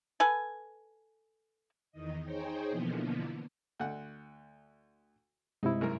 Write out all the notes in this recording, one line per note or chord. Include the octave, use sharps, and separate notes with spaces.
A4 B4 G#5
E2 D#3 D#5
D#4 G#4 C5 C#5 G5
B2 D3 E3 F3 A#3 B3
D2 F#5
G2 C3 G#3 D#4 E4
G#1 F#2 A#4